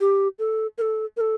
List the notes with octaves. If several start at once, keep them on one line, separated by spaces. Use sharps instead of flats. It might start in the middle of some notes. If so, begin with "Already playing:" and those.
G4
A4
A#4
A4
A#4
A4